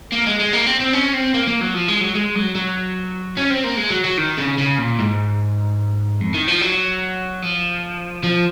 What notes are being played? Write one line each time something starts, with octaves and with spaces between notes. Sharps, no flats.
A#3
G#3
G#3
A#3
C4
C4
C#4
C4
A#3
A#3
F#3
F3
G#3
F#3
G#3
F#3
F#3
C#4
C4
A#3
G#3
F#3
F#3
D#3
C#3
C#3
A#2
G#2
F2
D#3
F3
F#3
F3
F3